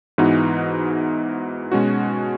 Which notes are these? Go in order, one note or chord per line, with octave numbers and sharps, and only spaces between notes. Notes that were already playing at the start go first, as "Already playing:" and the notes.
G#2 E3 B3 D#4 F#4
B2 G#3 C#4 F#4